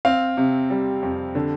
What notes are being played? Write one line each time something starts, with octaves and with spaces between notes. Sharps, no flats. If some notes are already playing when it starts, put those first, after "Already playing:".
C4 F5
C3
G3
F2
D3